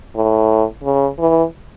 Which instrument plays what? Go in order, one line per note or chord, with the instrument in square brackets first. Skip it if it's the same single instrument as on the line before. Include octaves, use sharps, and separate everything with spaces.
[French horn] A2
C#3
E3